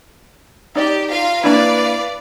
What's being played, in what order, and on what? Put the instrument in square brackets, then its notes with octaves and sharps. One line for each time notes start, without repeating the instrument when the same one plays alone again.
[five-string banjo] D#4 D5 [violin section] G4
[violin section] F4 F5 A#5
[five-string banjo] A#3 D4 E4 [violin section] B4 D5 F5